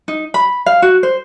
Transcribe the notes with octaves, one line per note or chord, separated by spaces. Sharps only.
D#4
B5
F5
F#4
C5